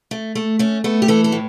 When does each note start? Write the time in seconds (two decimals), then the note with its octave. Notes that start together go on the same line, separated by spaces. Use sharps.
0.11 A3
0.35 A3
0.59 A3 C#4
0.84 A3 B3
1.02 G4
1.08 E3 A4
1.24 A4
1.32 A2